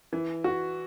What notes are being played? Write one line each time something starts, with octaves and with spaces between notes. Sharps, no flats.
E3
F#4